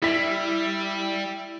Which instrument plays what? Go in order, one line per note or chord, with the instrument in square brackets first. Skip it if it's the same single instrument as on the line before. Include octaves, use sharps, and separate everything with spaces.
[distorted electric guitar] G3 [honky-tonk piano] E4 B6